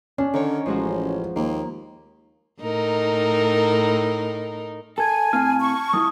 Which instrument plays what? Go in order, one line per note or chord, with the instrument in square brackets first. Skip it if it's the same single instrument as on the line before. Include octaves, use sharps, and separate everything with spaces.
[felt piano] C#4 [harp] D4
[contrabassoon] D3 [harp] D#3 C#5
[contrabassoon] A1 [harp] F3 G#3 F#4
[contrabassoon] D#2 [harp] A#3
[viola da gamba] A2 D#4 A#4
[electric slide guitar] A4 [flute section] G#5 [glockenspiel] A5 G#6
[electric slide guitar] A2 C4 F5 [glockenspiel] F6
[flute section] C#6
[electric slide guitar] G3 E4 F4 [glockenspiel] D#6